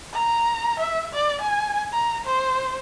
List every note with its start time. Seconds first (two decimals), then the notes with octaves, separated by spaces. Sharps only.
0.13 A#5
0.80 E5
1.13 D5
1.42 G#5
1.92 A#5
2.25 C5